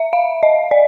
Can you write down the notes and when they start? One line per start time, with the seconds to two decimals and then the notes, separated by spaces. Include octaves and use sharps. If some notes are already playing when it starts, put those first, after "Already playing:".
Already playing: E5
0.13 F5
0.43 D#5
0.71 D5